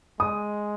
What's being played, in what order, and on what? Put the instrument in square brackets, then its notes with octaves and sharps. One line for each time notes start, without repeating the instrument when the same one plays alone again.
[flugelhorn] G#3 [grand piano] D#6